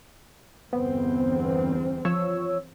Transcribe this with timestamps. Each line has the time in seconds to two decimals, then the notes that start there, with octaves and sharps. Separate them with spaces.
0.73 G1 E2 B3 C4
2.05 F3 C#5 E6